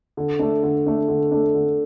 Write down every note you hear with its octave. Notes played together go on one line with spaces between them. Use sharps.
D3
A3 D4
D3
A3 D4
D3
A3 D4
D3